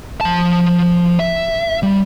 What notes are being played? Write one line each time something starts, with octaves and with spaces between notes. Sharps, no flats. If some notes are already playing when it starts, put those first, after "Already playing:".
F3 A5
E5
G3